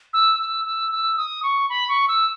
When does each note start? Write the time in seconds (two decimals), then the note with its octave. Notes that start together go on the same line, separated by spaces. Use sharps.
0.13 E6
0.39 E6
0.65 E6
0.92 E6
1.17 D#6
1.43 C#6
1.70 B5
1.89 C#6
2.08 E6